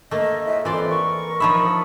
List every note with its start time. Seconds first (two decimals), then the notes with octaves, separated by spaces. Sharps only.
0.11 A3 A#3 D#5
0.46 A2 G#3 F4 E5
0.65 F2 E3 D5 C6
0.90 A#4 C#6
1.40 F3 D#4 C#5 E5 A5 B5